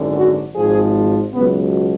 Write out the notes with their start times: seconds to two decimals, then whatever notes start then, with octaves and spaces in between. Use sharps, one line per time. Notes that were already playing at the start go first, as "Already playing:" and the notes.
Already playing: G#1 F#2 D3
0.16 F#4
0.55 G#1 G#2 F3 G#4
1.34 C#2 B2 F#3 B3